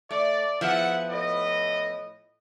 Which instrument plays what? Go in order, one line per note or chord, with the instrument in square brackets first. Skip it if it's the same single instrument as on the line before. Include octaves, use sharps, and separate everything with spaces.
[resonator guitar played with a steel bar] A3 [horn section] D5
[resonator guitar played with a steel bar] F3 B3 E4 [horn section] G#4 E5 F#5
[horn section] A2 B4 D#5